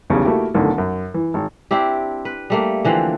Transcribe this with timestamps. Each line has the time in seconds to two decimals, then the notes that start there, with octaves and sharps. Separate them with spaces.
0.10 B1 E2 C#3 G3
0.25 A3 A#3 E4 F#4 G4
0.54 B1 A2 D3 D#3
0.78 F#2
1.14 E3
1.34 G#1
1.71 C4 D4 E4 G4
2.25 B4
2.50 G3 A3 A#3
2.85 D3 E3 F3 C4